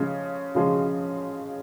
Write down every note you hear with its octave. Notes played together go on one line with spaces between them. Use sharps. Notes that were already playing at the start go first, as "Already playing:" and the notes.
Already playing: C#3 F3 G#3 C#4
C#3 F3 G#3 C#4